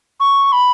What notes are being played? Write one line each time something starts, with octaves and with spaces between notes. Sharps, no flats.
C#6
B5